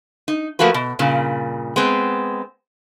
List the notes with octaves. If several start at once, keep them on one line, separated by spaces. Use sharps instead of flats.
D#4
F3 A3 A#3 F#4 B4
B2
G2 A#2 C#3
G#3 B3 C4